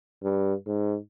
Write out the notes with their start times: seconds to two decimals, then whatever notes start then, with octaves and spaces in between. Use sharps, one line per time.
0.23 G2
0.67 G#2